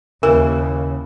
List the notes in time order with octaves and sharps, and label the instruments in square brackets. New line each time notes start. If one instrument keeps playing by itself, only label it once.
[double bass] D#2 [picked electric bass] C#3 [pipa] E3 [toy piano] A#4